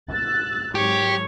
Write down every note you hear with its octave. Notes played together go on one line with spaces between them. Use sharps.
E6 F#6 A6
G#1 G#2 F#3 G4 C#5